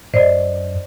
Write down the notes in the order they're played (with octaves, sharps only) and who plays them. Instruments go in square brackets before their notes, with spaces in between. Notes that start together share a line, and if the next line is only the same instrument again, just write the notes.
[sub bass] F#2 [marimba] C5 D5 D#5